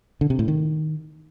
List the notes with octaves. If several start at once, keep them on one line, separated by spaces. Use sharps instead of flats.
D3
C3
A2
D#3